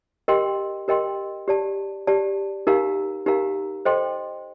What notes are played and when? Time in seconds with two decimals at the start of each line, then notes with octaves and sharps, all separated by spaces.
0.28 G4 A#4 D#5 G5 C6
0.88 G4 A#4 D#5 G5 C6
1.48 G4 D5 A5
2.07 G4 D5 A5
2.67 D#4 G4 A#4 F5 A#5
3.26 D#4 G4 A#4 F5 A#5
3.85 A4 C5 D#5 G5 C6